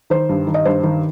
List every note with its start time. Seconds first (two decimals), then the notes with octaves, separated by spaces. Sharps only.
0.10 D#3 C5
0.29 G2
0.47 D#3
0.54 D#5
0.65 G2 C5
0.83 D#3